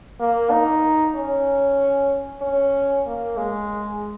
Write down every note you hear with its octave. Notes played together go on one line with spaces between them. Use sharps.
A#3
D#4
C#4
C#4
A#3
G#3